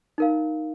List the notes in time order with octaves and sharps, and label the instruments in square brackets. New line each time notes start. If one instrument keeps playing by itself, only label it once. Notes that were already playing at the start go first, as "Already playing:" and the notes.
[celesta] D#4 A#4 F5